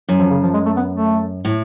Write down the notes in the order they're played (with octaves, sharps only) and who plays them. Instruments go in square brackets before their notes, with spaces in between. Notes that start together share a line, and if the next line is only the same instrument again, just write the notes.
[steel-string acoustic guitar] F#2
[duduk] F3
C#3
F3
G#3
A3
B3
A3
[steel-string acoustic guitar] A2